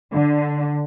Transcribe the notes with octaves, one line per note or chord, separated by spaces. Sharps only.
D3